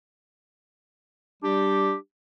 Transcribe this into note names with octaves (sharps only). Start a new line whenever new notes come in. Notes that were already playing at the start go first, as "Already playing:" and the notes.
G3 D4 G4